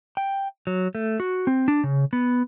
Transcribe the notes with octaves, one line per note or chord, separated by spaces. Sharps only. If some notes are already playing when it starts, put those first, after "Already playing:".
G5
F#3
A3
F#4
C4
D4
C#3
B3